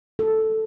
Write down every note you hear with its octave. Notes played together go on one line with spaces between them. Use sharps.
A4